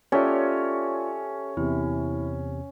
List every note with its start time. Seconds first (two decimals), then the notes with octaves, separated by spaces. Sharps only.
0.12 C#4 F4 G4 A4 C#5 D5 E5
1.57 E2 C3 E4